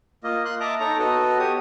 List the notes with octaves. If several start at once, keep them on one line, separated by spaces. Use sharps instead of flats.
A#3 F4 D#5
C6 F#6
D#5 E5 A5 A#5 D6
D#4 A4 C#5 A#5
B3 F#4 A4 D#5
G4 C#5 D#6